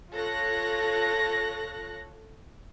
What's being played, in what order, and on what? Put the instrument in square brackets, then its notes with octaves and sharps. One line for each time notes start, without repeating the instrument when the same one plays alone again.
[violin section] F4 A4 C#5 F#6 A#6